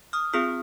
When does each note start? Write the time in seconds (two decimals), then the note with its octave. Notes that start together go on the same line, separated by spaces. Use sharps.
0.13 D#6 F6
0.33 C4 F4 G#4 D#6 F6